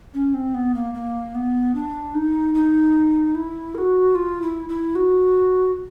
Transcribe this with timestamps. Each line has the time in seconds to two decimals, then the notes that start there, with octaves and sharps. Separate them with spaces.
0.14 C#4
0.34 C4
0.54 B3
0.75 A#3
0.94 A#3
1.35 B3
1.75 D4
2.15 D#4
2.55 D#4
3.35 E4
3.75 A#4
3.78 F#4
4.15 F4
4.42 E4
4.69 E4
4.95 F#4